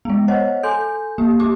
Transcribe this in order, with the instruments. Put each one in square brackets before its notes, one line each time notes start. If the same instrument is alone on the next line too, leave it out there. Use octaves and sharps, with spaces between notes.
[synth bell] G#3 B3
[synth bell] C5 [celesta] C#5 D#5 F#5
[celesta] A4 G#5 C6 [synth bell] G6
[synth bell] A#3 G4
[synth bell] A#3 G4 [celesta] D6